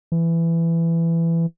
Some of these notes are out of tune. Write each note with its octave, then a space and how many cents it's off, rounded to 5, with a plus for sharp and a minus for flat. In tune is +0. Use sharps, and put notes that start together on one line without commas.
E3 +15